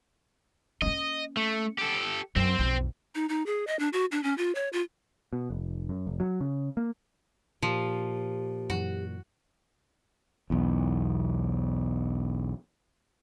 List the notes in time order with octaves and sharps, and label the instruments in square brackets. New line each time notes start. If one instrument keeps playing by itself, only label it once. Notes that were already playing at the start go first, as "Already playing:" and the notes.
[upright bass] A#3 C#4 [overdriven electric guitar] D#5
[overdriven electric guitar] A3
G4 A4
[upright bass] F#2 [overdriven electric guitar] C4 C5
[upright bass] B1 F2
[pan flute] D#4
D#4
G#4
D#5
D4
F#4
D4
C#4
F4
C#5
F4
[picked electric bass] B2
F1
F#2
F1
F#3
C#3
A#3
[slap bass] A#2 [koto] F3 [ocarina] G4
[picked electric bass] F#2 E3 [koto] F#4
[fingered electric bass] B1 E2